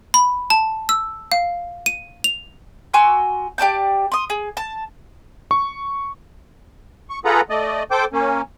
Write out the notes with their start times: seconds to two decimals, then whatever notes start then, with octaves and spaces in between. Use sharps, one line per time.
0.14 B5
0.50 A5
0.89 E6
1.32 F5
1.86 D#7
2.24 F7
2.94 F#4 G#5 C6 E6
3.58 G4 D5 A5 G6
4.12 C6 D#6
4.30 G#4
4.57 A5
5.51 C#6
7.10 C#6
7.25 F4 G#4 A4 B4 F#5 A#5
7.50 A3 D5 D#5
7.91 A4 C5 G5 D6
8.13 A#3 C#4